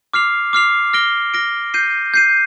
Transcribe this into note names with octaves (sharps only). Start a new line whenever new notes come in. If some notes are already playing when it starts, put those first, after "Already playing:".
D6 F6 C7 F7
D6 F6 C7 F7
F6 A#6 D7 G7
F6 A#6 D7 G7
G6 C7 D#7
G6 C7 D#7